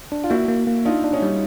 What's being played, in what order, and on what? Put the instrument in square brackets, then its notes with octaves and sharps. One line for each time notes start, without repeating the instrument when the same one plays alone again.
[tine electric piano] D4
[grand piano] F4
[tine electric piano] A#3 [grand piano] E4 F#4
[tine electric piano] A#3
A#3
[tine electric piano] D4 [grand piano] D#4 F4
[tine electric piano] D4
[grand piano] C#4 D#4
[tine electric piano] G3